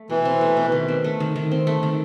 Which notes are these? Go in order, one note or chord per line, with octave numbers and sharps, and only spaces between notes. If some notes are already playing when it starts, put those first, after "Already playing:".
Already playing: A3
B2 E3
C4
A3
B2
D#3
C4
A3
D#3
D#3
C4
A3
D#3